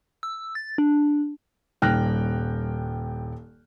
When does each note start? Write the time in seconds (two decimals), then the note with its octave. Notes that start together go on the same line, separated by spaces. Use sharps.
0.23 E6
0.55 A6
0.78 D4
1.82 D#1 G2 G5 F6 F#6 A#6